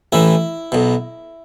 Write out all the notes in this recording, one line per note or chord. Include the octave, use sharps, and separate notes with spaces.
A1 A2 E3 E4
B1 B2